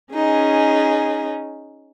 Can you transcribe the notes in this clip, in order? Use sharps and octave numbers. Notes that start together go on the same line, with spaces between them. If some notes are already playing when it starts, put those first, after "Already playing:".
C#4 D#4 G#4